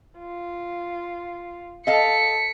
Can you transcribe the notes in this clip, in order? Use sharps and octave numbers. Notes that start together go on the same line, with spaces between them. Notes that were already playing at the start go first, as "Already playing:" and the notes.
F4
A4 D#5 F5 A5 B6 C#7